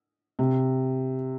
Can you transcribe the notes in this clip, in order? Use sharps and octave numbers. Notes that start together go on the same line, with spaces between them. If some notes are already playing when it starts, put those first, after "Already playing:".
C3